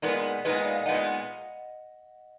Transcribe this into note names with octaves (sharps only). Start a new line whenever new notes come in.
A#2 G#3 B3 D#4 A#4 D5
A#2 G#3 B3 D#4 B4 D#5
D5 F5
F5 G#5
A#2 G#3 B3 D#4 D#5 F#5